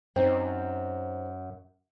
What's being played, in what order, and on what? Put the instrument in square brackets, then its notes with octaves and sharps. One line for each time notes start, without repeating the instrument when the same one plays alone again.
[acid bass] F#2 [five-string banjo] C4 D#4